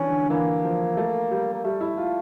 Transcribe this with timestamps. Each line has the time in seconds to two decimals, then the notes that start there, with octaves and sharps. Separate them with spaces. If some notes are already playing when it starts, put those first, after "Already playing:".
Already playing: E3 C#4 D4
0.08 D3
0.22 D3
0.30 E3 A#3
0.64 F3
0.97 A3
1.31 G3
1.53 A#3
1.64 G3 A3
1.81 E4
1.98 F4